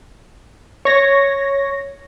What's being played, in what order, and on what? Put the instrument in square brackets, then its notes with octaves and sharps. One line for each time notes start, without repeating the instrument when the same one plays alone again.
[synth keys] C#5 A#6